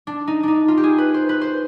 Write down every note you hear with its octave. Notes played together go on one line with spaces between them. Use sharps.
D4
D#4
D4 D#4
F4
G4
G#4
B4
C5
B4
C5